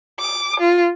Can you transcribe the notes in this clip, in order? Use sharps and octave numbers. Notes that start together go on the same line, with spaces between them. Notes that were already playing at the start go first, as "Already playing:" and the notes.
D6
F4